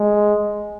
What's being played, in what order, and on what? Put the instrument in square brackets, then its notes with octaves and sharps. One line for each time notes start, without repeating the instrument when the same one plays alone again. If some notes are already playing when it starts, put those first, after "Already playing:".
Already playing: [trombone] G#3